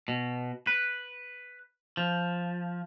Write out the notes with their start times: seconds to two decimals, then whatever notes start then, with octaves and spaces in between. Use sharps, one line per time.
0.08 B2
0.67 B4
1.97 F3